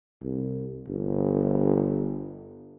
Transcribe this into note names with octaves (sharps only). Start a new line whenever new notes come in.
C2
G1